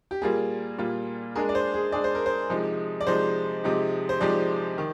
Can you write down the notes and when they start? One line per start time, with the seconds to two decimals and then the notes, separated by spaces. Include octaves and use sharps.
0.11 G4
0.22 A#2 G3 A#3 F4 G#4
0.78 A#2 G3 A#3 F4
1.35 G#3 D4 G#4 A#4
1.49 D5
1.55 C5
1.74 G#4
1.92 G#3 D4 G#4 D5
2.04 C5
2.15 A#4
2.26 C5
2.50 C3 F3 G#3 D#4
3.01 D5
3.07 C3 F3 G#3 D#4 C5
3.64 C3 F3 G#3 D#4 G4
4.09 C5
4.20 C3 F3 G#3 D#4 G4 D5
4.78 D#3